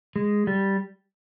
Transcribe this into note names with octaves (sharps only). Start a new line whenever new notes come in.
G#3
G3